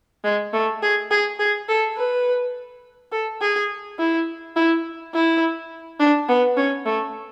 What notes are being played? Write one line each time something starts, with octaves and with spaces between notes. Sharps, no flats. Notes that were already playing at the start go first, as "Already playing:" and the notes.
G#3
A3
G#4
G#4
G#4
A4
B4
A4
G#4
E4
E4
E4
D4
B3
C#4
A3